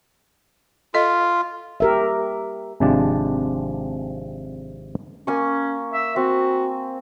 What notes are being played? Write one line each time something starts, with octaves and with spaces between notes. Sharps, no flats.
F4 A4 D#5
G4 A#4 E5
G#1 C3 F3 G#3 D4 A5
A#3 C#4 G#5 C#6
E5
C4 F#4